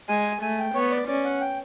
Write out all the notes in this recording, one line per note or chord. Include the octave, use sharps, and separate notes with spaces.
G#3 G#5
A3 G#5
G5
B3 C#5
D5
C#4 D5
F#5
G5